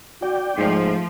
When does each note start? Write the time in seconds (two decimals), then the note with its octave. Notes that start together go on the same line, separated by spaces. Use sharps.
0.22 F#4 D5 G5
0.57 G#2 F3 A3